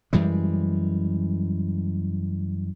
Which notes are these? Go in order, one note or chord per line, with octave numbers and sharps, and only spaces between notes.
F#2 E3 G3 G#3